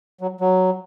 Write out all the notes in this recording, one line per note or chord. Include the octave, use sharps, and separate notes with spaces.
F#3
F#3